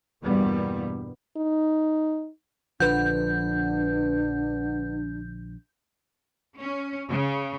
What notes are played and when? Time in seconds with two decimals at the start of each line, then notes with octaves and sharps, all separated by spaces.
0.22 E2 G2 B2 G3 A#3 B3
1.37 D#4
2.80 A#1 D3 F3 D4 B4 F#5 G6
6.61 C#4
7.10 C#3